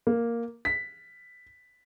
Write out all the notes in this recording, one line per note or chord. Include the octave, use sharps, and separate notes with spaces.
A#3
B6